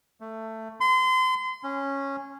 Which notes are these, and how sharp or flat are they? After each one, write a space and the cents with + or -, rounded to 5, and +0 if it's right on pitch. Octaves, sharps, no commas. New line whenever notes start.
A3 +15
C6 -30
C#4 -10